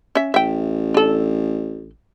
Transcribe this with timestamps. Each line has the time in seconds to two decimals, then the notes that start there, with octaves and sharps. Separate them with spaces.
0.15 C#4 E5
0.34 A1 E5 G5
0.94 D4 A4